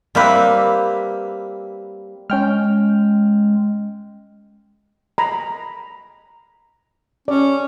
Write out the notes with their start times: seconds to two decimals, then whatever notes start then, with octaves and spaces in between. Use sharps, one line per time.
0.15 G3 A#3 C4 E4 B4
2.30 G#3 C#4 G5 F6
5.18 A#5 B5
7.28 C#4 D5